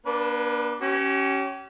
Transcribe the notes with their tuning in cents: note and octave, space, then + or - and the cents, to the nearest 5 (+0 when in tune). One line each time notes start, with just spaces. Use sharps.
A#3 +45 D4 +0 B4 +5
C#4 +0 G4 -40